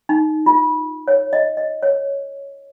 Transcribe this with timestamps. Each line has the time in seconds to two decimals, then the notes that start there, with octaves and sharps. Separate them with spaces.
0.09 D#4
0.46 F4
1.08 C#5
1.33 D#5
1.57 D#5
1.83 C#5